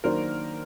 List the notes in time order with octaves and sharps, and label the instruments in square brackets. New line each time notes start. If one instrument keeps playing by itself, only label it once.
[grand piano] D#3 F#3 A#3 D4 [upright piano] A#4 C5